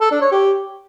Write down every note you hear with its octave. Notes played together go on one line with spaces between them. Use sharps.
A4
D4
C#5
G4